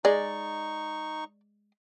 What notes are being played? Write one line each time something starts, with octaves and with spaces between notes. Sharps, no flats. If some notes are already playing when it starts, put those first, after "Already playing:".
G#3 D#4 D5 C#6